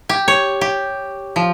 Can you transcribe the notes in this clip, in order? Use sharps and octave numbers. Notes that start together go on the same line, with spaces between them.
G4
C#5
G4
F3